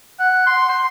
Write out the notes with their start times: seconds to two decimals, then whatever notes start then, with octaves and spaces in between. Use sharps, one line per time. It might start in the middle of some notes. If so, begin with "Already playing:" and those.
0.19 F#5
0.46 C6
0.69 C6